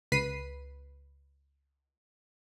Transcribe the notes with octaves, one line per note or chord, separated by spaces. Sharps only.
C#2 B4 B6 C7 D#7